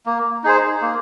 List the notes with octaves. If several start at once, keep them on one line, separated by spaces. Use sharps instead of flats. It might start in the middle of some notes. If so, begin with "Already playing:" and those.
A#3
D#4 G#4 C5
A#3